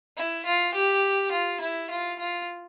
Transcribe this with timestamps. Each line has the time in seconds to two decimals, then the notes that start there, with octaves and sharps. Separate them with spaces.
0.17 E4
0.46 F4
0.74 G4
1.32 F4
1.61 E4
1.90 F4
2.19 F4